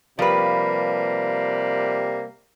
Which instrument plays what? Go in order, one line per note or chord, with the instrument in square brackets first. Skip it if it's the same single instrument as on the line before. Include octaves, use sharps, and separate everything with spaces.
[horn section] C3 G3 A#3 [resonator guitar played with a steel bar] F3 B4